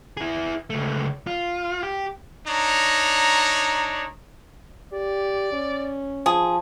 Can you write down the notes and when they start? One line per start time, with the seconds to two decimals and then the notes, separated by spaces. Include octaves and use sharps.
0.17 E4 G#4
0.70 C#2 A3
1.27 F4
1.83 G4
2.47 D4 D#4 C#5 A#5
4.93 G4 D5
5.53 C#4
6.26 F3 G#4